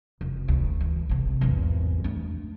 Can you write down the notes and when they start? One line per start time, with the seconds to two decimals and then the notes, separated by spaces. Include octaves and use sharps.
0.21 F1
0.48 D2
0.81 E3
1.09 A#1 C3
1.41 G#1 E2
2.04 A3 D4